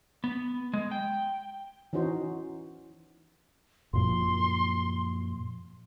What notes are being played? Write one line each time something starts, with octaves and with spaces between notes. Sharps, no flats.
B3
G#3
G5
E3 C#4 D#4 F#4 C5
F#2 A#2 F3 C6